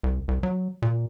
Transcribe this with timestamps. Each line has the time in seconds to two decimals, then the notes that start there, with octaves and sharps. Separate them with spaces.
0.03 C2
0.28 C2
0.43 F#3
0.82 A#2